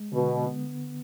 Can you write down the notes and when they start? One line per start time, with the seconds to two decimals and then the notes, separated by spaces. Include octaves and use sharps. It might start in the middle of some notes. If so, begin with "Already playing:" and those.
Already playing: G#3
0.12 B2 D3
0.47 B3